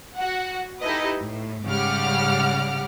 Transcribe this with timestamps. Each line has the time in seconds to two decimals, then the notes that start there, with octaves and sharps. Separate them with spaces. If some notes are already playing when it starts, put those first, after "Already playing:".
0.16 F#4 F#5
0.81 D#4 E4 G4 A4 B4 D#5
1.19 A2
1.67 G#2 C#3 G3 F#5 D6 F6